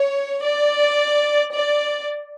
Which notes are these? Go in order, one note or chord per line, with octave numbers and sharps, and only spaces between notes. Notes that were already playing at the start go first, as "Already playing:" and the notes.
Already playing: C#5
D5
D5